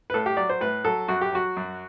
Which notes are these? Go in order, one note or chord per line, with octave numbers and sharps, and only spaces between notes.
B4
A2 A4
G4
F#3 D5
C5
A2 B4
F#3 A4
F#2 F#4
G4
F#3 F#4
F#2